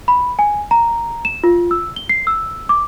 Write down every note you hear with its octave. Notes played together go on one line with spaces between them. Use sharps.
B5
G#5
A#5
E7
F4
E6
G7
C7
E6
D6